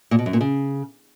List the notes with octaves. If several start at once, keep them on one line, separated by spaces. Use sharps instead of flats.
A#2
B2
F#2
A#2
C#3